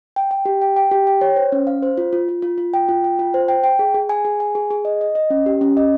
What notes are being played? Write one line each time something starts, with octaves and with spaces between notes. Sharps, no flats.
G5
G5
G4
G5
G5
G4
G5
C#5
C5
C#4
F5
C5
F4
F4
F4
F4
F4
G5
F4
G5
F4
C5
G5
G5
G#4
G#4
G#5
G#4
G#5
G#4
G#4
D#5
D#5
D#5
C#4
G4
C#4
D#5